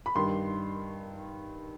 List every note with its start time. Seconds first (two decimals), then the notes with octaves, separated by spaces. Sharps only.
0.06 B5
0.15 G2 D#3 C6